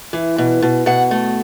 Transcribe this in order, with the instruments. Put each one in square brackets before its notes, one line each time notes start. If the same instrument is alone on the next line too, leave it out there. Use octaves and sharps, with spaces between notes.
[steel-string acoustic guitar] E3
B2
B2
B2 F#5
A3